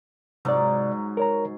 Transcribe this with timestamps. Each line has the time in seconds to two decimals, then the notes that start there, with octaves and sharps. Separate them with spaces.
0.45 G#2 C3 F#3 D5
1.17 A#4 C#5 A#5